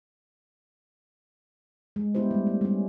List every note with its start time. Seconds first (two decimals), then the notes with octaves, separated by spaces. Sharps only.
1.96 G#3
2.15 G3 B3 D4 E4 G4 C5
2.31 G3 A3
2.47 A3
2.61 G3 A3 C#4